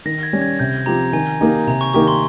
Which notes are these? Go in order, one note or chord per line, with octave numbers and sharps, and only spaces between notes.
D#3 A#6
G#6
G3 C#4
G#6
C3 G6
F3 C4 G4 A#5
D#3 G#5
A#3 D#4 G4
C3 A#5
C#6
D#3 A#3 D#4 G4 C#6
C6